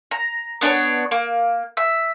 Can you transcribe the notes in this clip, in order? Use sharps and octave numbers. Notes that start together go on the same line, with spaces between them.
A#5
B3 D4 A#4 C#5
A#3
E5